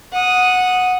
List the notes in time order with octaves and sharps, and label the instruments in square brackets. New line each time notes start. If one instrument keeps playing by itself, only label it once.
[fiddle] F#5 D#6